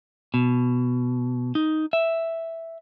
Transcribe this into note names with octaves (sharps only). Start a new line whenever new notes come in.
B2
D#4
E5